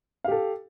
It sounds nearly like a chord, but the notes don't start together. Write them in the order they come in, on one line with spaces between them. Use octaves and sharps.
F5 G4 A4